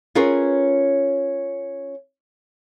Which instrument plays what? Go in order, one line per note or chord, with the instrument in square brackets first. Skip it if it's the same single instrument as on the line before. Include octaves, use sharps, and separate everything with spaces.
[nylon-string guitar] C#4 F4 G#4 A#4 B4 C#5